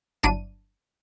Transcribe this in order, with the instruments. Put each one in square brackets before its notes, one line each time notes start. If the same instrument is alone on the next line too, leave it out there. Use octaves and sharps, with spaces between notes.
[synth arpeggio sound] G1 F#3 D4 E4 D#7